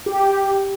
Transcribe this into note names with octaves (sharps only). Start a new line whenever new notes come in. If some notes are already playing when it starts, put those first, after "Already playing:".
G4